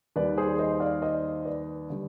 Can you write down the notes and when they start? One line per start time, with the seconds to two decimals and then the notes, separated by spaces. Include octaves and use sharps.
0.16 D#2 D#3 G3 B4 D5
0.38 G#4 C5
0.59 C5 D#5
0.80 D5 F5
1.02 C5 D#5
1.45 B4 D5
1.90 D3 G3